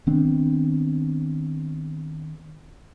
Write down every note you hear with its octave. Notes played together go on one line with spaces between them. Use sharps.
D#3 B3 C4 D4